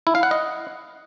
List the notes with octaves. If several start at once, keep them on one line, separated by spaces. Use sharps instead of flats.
E4
F5
F#5
D#5